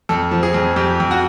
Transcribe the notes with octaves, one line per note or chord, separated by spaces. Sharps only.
F2 A4
F3
G#4
F2
F2 G4
F2
F#4